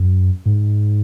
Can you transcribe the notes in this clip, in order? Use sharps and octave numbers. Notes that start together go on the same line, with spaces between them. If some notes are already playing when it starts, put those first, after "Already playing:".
Already playing: F#2
G#2